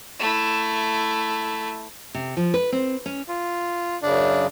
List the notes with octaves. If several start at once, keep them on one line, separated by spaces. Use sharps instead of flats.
A3 E4
C3
F3
B4
C4
C#4
F4
F#2 C#3 D4